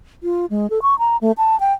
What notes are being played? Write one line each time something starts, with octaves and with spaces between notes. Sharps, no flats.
F4
G#3
A4
C#6
A#5
A3
A5
G5